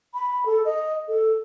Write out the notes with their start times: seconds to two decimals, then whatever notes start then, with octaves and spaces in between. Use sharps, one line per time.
0.14 B5
0.46 A4
0.65 D#5
1.08 A4